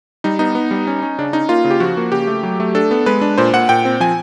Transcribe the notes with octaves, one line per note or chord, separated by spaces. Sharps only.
G3 D#4
B3 D#4
B3
G3
C#4
C#4
C#3 D4
C#4 D#4
A#3 F4
C#3
G4
F3 F#4
A#3
C#3 G4
A3
F#3
A3
D4 A4
B3
G#3 B4
D4
A#2 C5
A#2 F#5
A#2 G5
C4
F3 G#5